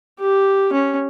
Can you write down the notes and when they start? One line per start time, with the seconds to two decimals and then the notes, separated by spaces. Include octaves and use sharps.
0.20 G4
0.73 C#4